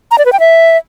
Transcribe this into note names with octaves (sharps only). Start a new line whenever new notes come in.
A#5
D5
B4
G5
E5